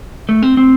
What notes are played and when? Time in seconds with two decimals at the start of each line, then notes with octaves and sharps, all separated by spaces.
0.29 A3
0.43 C4
0.57 C4